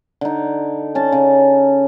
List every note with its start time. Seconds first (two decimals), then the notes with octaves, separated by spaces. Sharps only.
0.21 D3 D#4
0.95 C#4 A5
1.12 C#3